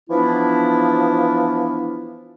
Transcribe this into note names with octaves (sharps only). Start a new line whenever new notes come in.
E3 F3 B3 D4 E4